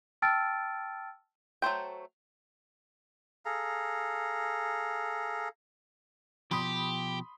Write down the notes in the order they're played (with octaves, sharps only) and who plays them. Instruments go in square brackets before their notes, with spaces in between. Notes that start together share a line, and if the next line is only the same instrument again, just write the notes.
[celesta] G5 A5 E6 F6 A6 D7
[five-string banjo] F#3 A3 C5 G5
[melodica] G#4 A4 F5 A#5
[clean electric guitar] B2 F3 [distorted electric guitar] G4 [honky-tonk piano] B5 C6 D#6